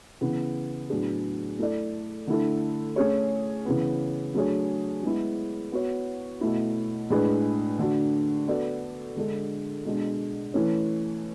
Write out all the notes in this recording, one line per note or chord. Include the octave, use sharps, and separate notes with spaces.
C#3 E3 B3
A2 F#3 B3 D4 G#4
A3 E4 A4 D5
D3 A3 E4 A4
A3 C#4 G#4 C#5
C#3 E3 B3
F#3 A3 D4 G#4 C#5
G#3 B3 E4
B3 F#4 C#5
B2 A3 E4
A2 G#3 D4 G#4 B4
D3 A3 D4 F#4
B3 F#4 A4 D5
D3 G#3 D4 A4
B2 G#3 D4
E3 A3 C#4